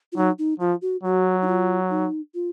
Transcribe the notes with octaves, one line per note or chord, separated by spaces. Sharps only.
F4
F#3 D#4
D#4
F3 F4
F#4
F#3 F#4
D#4
F4
D#4
F4